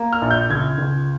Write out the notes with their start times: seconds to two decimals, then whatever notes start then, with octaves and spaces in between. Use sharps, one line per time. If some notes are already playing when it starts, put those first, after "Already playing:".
Already playing: A#3
0.13 F6
0.22 A#1
0.31 G6
0.50 C#2 G#6
0.78 C#2